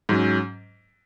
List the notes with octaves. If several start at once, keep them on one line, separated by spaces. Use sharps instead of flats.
G#2 F#3 C#4